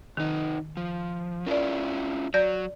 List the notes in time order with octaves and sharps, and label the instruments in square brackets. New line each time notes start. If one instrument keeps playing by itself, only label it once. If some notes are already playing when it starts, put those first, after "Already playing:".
[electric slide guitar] C3 D#4 [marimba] D#3
[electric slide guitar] F3
[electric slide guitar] C#4 E4 F4 [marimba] A#4 D5
[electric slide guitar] F#3 [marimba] D5 G6 A#6